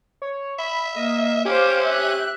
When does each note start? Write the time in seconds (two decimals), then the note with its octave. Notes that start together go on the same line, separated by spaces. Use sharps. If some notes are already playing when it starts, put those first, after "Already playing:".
0.22 C#5
0.59 E5 B5
0.96 A#3 D#5
1.45 C#4 G4 C5 F5 D6
1.83 E5 F#6